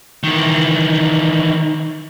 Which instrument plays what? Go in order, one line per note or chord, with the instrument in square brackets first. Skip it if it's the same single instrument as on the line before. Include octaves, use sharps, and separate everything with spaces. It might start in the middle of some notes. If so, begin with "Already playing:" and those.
[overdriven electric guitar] D#3 E3